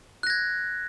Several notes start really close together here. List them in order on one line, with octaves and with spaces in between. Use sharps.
F#6 A#6 G#6